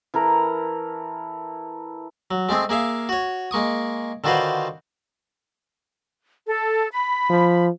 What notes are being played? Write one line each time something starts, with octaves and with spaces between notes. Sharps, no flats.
E3 A4 A#4 A#5
F#3
G#3 A3 C4 G#4
A#3 G#4 E5 F5
F#4 C#5
G#3 A#3 C#6 D#6
D3 D#3 F4 F#4 B4 C5
A4
B5
F3